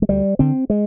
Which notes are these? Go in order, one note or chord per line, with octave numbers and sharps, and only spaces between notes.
G#3
D2 G3
D3 C4
G#3